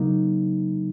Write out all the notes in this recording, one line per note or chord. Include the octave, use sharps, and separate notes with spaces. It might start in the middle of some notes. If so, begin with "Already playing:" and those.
Already playing: C#3 F#3 A#3 D#4